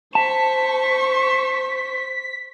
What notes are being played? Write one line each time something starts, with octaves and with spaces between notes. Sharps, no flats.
C5 A5 C#6 B6